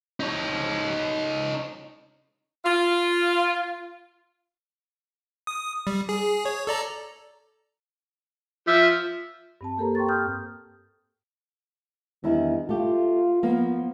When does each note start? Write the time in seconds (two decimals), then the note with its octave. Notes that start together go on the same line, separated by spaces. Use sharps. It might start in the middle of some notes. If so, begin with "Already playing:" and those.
0.20 D#4 C#5
2.65 F4
5.47 D#6
5.87 G3
6.09 G#4
6.45 C#5
6.67 A4 D5 A#5
8.67 F3 E5
9.61 G2 C4 A5
9.78 A#3 G4 A4 A#4 C5 A#5
9.95 G5 C6 C#6 A6
10.09 D#6 F6 G6
12.24 E2 G2 D#3 E4
12.69 A3 F4 G4
13.43 F3 A#3 B3